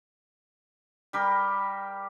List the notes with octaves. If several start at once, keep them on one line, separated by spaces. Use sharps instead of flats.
G3 G4 A#4